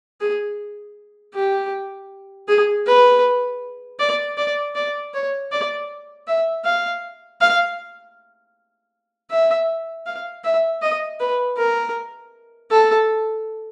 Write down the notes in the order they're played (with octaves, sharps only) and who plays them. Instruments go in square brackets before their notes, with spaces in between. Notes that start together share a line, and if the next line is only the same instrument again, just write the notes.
[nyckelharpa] G#4
G4
G#4
B4
D5
D5
D5
C#5
D5
E5
F5
F5
E5
F5
E5
D#5
B4
A#4
A4